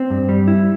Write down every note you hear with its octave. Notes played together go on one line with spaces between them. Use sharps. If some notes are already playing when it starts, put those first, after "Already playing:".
Already playing: C4
G2
G3
E4